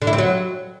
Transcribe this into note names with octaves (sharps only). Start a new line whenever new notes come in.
D3
E4
C4
F#3